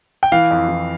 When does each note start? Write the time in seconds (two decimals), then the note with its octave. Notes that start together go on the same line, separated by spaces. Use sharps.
0.23 G5
0.32 E3 F5
0.51 F2
0.69 E3